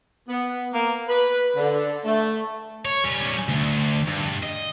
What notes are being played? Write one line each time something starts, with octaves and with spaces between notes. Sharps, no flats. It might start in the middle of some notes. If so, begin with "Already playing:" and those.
B3
A#3
B4
D3
A3
C#5
G3 C#4
D2
G2
D#5